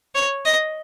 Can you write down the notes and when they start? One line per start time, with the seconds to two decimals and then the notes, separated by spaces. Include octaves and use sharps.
0.15 C#5
0.46 D#5